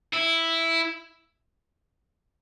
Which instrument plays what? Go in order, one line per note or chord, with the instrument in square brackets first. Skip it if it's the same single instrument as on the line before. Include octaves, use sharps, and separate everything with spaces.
[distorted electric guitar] E4